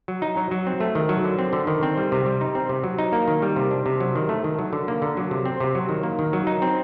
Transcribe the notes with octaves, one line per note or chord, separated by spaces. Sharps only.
F#3
D#4
F#3
F#3
C4
A3
D#3
F#3
D3
C4
D3
D#3
C4
G3
C3
G3
D#4
C4
C3
F#3
D#4
A#3
D#3
G3
C3
D4
C3
F#3
D#3
A3
D#3
F#3
D3
A#3
D3
F#3
C3
C4
C3
F#3
D#3
A#3
D#3
F#3
D#4
C4